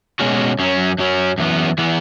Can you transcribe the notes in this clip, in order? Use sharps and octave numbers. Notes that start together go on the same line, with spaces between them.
B2 G#3 C#4 F#4
F#2 F#3 C#4
F#2 F#3 C#4
F#2 E3 B3
E3 B3